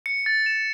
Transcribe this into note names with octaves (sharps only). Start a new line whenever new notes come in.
C#7
A6
E7